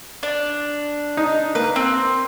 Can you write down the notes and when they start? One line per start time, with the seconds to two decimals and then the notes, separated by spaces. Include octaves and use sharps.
0.23 D4
1.17 D#4
1.55 A#3 B4
1.76 C4